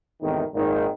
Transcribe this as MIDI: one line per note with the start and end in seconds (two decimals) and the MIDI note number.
0.22 0.43 32
0.22 0.43 40
0.22 0.43 45
0.22 0.43 48
0.22 0.43 51
0.54 0.88 32
0.54 0.88 46
0.54 0.88 51